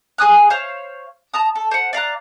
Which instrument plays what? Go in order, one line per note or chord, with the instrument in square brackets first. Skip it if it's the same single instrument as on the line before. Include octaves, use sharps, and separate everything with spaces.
[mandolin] G#4 G#5 D#6 F#6
C5 C#5 F5
A5 A#5 D#6
A4
C5 F#5
D5 F5 A#5 F#6